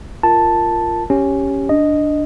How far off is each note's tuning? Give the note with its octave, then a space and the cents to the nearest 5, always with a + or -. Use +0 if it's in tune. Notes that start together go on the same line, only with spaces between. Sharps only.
F4 -10 A#4 -5 A5 +0
C#4 +0 G4 +0
D4 +0 D#5 -5